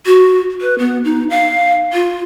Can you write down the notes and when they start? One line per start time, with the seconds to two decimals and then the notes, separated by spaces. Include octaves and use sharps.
0.06 F#4
0.61 B4
0.79 B3
1.04 D#4
1.30 F5
1.93 F4